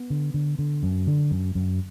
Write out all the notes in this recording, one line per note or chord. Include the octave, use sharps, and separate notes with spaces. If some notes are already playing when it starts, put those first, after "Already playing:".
Already playing: B3
D3
D3
D3
F#2
D3
F#2
F#2